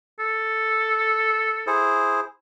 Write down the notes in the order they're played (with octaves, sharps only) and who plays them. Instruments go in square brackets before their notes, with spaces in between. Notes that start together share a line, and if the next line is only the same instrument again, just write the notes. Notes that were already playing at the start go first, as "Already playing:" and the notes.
[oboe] A4
[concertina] E4 G#4 C5